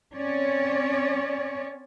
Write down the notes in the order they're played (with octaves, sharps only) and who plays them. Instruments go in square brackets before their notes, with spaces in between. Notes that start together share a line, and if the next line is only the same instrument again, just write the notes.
[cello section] C4 C#4 C#5 D5